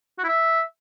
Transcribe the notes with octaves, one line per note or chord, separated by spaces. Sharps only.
F#4
E4
E5